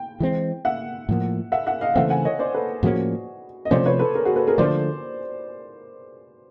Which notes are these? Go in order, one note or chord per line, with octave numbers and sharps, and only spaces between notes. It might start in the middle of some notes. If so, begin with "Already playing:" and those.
Already playing: G5
E3 G#3 C4
E5 F#5
A2 F3 A#3
E5 F#5
E5 F#5
D#5 F5
C#3 E3 A3 C4 E5 F#5
F#5 G#5
C#5 D#5
C5 D5
A4 B4
A2 F3 A#3 C#4 F#4 G#4
D#5
C3 F3 A3 C#4 C5 D5
B4 C#5
A4 B4
G#4 A#4
F#4 G#4
A4 B4
G#4 A#4
D3 F3 A3 C5 D5